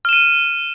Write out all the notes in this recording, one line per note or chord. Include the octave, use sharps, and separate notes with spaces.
F6 D#7 E7